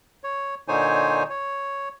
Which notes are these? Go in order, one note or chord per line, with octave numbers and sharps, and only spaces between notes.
C#5
A#2 D3 D#4 C5 C#5 G#5
C#5